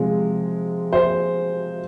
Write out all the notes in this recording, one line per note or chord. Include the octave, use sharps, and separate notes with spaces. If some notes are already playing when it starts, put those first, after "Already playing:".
Already playing: C3 F3 G#3
C5